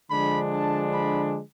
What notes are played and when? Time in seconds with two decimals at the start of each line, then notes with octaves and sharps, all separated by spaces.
0.10 D3 F3 G#3 D4 B5
0.51 A5
0.93 B5